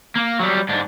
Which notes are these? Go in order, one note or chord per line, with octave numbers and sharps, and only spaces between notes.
A#3
F#3 G3
G#2 D4